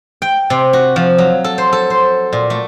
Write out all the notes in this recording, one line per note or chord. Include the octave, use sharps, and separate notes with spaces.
G5
C3
F#4
F3
F#3
A4
C5
A4
C5
A#2
A3